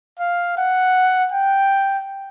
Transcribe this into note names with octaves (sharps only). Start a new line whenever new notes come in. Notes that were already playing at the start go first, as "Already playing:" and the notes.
F5
F#5
G5